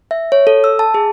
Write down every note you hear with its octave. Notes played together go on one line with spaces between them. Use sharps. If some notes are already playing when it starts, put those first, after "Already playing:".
E5
C#5
A4
E6
A5
G#4